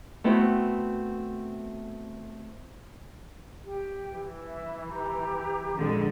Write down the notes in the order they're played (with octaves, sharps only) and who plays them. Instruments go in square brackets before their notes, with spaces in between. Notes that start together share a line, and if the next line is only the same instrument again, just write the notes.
[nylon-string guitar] A3 B3 C4 E4 F#4
[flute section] G4
[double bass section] E3
[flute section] E5
G4 A#5 G6
[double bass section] A#1 F2 [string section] D3 G#3